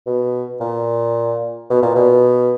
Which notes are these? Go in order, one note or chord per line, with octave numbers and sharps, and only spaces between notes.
B2
A#2
B2
A#2
B2